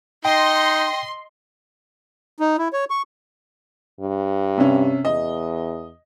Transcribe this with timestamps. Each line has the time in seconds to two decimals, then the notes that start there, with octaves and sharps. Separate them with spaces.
0.25 D#4 D#5 G5 C6
2.40 D#4
2.58 E4
2.73 C#5
2.90 C#6
4.01 G2
4.57 C3 C#4
5.05 E2 D#5